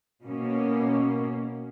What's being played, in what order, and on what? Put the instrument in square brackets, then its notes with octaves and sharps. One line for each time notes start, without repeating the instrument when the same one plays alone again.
[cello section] B2 A#3 C#4